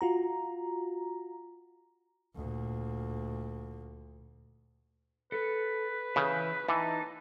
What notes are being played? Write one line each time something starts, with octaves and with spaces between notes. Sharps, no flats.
F4 F#4 A#5
D2 A#2
A4 B4
C#3 E3 G6
E3 D#4 A5